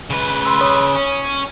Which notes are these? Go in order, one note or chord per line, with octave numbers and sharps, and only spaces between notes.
C#3 B4
B5 C6 E6
C#5 D#6
C#4